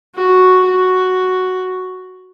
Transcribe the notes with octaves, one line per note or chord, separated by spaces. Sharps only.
F#4
F#4